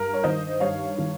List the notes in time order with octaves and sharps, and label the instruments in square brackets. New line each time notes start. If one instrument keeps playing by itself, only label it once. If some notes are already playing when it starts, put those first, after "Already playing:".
Already playing: [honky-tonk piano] G2 A#4
C#5
D#3 C5 D#5
G2 C#5 F5
D#3